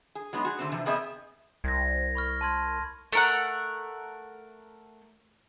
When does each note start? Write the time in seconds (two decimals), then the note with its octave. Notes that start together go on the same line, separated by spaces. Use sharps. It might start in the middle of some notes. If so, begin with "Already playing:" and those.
0.15 G#4
0.33 F#3 G#3 B3 D#4
0.45 F#4 G#4
0.59 D3 A3 C4
0.72 C3 E3 F3
0.86 B3 C4 G#4 D#5 E5
1.64 C2 G#6 A#6
2.15 B5 C#6 F6
2.41 A5 C6 G#6
3.13 A3 A#4 F#5